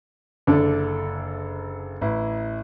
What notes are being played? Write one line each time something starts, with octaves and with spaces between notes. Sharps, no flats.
F#1 D3 A4 E5
A1 E4